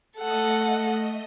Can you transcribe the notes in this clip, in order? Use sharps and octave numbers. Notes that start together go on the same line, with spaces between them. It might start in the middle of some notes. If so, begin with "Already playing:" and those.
A3 A4 D#5 F#5